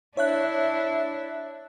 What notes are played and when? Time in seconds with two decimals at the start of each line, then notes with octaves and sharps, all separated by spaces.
0.17 D4 E4 C#5 E5 F#6